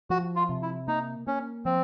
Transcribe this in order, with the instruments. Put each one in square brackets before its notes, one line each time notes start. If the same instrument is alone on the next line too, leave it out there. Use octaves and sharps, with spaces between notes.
[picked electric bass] F3 [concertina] F#4
[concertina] F4
[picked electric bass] C3
[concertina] E4
[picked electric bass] A#3 [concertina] D#4
[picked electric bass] A#3 [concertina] C#4
[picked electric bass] F3 [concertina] C4